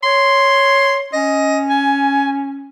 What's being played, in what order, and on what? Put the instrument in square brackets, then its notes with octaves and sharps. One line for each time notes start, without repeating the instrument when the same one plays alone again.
[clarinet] C#5 [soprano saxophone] C6
[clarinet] C#4 [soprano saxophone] D#5
[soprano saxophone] G#5